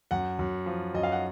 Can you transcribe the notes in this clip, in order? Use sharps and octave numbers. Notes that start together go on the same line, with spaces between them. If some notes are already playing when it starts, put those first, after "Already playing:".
F#2 F#5
F#2
F3
F#2 D#5
F5
F#5